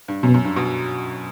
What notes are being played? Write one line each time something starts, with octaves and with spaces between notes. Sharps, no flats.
G2
F#2 B2
F#2
G2
B2